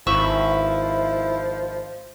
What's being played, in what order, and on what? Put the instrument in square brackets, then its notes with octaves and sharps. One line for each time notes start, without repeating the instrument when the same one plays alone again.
[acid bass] G#1 [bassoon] F3 [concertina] E4 [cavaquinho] B4 E5 C#6